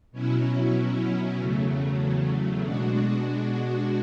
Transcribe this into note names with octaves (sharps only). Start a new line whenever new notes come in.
B2 F#3 C#4 E4
E2 C#3 F#3 A3
B2 G#3 D4 F#4